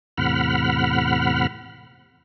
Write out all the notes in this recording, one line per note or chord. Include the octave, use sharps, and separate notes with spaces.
E2 A2 C3 F#5 B5 F6